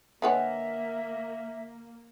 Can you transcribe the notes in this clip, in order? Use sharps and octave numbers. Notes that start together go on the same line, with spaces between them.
D3 A#3 B4 C#5 D#5 E5 F#5 G#5